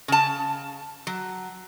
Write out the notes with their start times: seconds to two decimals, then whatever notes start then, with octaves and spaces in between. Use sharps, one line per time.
0.08 C#3 A5
1.07 F#3